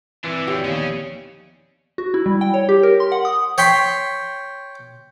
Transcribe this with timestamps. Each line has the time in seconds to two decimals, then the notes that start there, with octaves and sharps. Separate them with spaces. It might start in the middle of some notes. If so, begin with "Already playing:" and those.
0.24 A#2 D3 E3 G3 C4 D4
0.47 F#2 C4 G4 C#5 D5
0.65 D#2 F3 B3 C#4 G#4 C#5
1.98 F#4
2.14 E4
2.26 G3
2.41 G5
2.54 C#5
2.69 G4
2.83 A#4
3.00 C6
3.12 F#5
3.25 D#6
3.58 C#5 G5 B5 C6